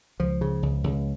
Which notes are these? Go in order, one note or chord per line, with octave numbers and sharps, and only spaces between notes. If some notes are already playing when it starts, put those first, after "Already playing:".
C#2 F3
C#3
C#2
C#2